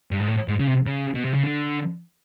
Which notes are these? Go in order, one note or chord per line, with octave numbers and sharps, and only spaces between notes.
G2
G#2
A2
G#2
C#3
C3
C#3
B2
C3
C#3
D3